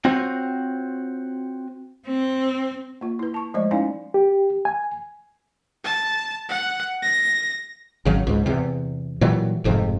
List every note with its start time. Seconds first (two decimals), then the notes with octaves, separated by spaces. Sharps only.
0.05 C4 F4 F#4 C5 C#5
2.07 C4
3.01 A#3 F4
3.19 E4 B4
3.34 A5 C#6
3.54 F3 G#3 A3 C5 D5
3.71 C#4 D#4 E4 D5 F5 G#5
4.14 G4
4.65 G#5
5.84 A5
6.49 F#5
7.03 A#6
8.05 G#1 C#3 F#3
8.27 C#2 G#2
8.46 E2 C3
9.21 A#2 E3 F#3 G3
9.64 F1 F2 G#2 C3